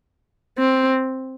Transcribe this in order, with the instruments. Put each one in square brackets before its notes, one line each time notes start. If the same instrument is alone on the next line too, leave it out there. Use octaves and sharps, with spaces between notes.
[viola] C4